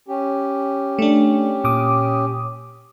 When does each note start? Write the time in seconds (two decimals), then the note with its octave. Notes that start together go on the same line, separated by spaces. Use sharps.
0.08 C#4 G4
0.99 A3 D4
1.64 A#2 D6 D#6